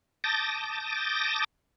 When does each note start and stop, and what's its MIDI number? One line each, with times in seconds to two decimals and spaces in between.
0.24 1.44 81
0.24 1.44 86
0.24 1.44 87
0.24 1.44 91
0.24 1.44 93
0.24 1.44 94